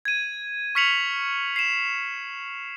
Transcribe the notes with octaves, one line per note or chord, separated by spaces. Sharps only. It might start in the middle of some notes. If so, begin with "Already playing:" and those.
G#6 D#7
C#6 F6 B6 C#7 F7 F#7
C7 E7